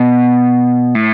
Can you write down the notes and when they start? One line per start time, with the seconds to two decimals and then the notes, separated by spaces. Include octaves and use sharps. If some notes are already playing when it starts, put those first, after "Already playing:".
Already playing: B2
0.95 A2